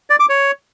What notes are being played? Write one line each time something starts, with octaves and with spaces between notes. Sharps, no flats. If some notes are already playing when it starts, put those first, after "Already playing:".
D5
D6
C#5